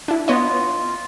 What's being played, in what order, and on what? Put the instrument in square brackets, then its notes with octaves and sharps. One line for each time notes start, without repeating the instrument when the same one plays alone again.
[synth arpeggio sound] D4 E4
[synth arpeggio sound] B3 C#5 D#5 [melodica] F4